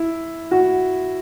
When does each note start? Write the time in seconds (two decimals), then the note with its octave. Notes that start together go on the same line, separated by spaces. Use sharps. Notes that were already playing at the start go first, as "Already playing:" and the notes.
Already playing: E4
0.51 F#4